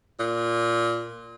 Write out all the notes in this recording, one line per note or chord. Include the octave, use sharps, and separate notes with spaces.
A#2